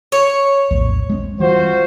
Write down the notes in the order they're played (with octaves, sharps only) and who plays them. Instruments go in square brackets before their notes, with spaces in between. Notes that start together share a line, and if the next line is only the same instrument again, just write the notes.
[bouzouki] C#5
[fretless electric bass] A#1 E2 A2
G#3 B3 C4
[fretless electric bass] E3 G3 [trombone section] F4 F#4 C5